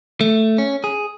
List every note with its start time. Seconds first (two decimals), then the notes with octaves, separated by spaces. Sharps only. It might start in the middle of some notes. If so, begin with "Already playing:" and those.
0.21 A3
0.58 C#4
0.84 G#4